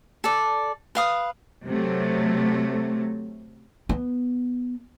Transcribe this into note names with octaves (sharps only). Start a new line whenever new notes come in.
A4 D5
B4 F5 D#6
C3 F#3 A3
B3